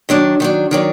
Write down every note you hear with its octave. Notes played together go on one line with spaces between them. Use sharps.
D#3 F#3 D4
D#3 F#3 D4
D#3 F#3 D4